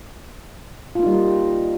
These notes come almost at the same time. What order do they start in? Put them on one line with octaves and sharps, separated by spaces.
F4 A#3 D#4 G3